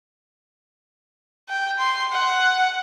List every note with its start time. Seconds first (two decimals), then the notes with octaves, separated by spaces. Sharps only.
1.49 G5
1.79 C6
2.12 F#5